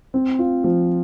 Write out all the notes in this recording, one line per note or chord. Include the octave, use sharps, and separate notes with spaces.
C4
F4
F3